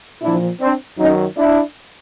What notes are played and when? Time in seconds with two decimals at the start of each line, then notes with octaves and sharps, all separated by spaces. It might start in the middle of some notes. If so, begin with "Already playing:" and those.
0.22 A#2 F3 D4 E4
0.60 C4 D4
0.98 F#2 D#3 F#3 C#4 D#4
1.37 D4 E4